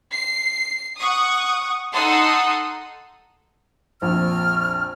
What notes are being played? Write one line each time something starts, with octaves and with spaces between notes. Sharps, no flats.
C7
F#5 C#6 D#6
D#4 A4 F#5 C6 D#6
A#1 F2 F6